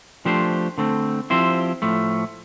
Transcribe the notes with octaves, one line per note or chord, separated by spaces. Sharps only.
F3 A3 D4 G4 C5
D3 A3 C4
F3 C4 E4 G4 C5
A2 F3 A3